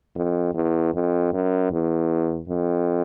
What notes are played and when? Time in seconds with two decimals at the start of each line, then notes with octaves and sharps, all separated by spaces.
0.16 F2
0.54 E2
0.94 F2
1.33 F#2
1.72 E2
2.49 F2